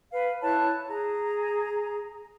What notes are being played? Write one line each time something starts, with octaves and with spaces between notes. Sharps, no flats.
B4 F5
E4 C#5 A5 F#6
G#4 A#5